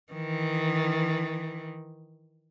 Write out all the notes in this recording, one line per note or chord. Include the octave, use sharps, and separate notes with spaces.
D#3 E3